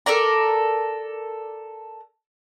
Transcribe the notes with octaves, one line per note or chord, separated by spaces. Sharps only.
A4 A#4 D5 A#5